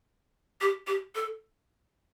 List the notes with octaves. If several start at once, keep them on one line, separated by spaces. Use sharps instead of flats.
G4
G4
A4